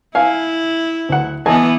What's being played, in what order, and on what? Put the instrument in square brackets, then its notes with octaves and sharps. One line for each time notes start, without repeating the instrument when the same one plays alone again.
[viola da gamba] E4 [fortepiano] F5 G#5
[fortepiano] D2 F#5
[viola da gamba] E3 B3 [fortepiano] D#5 G#5 A5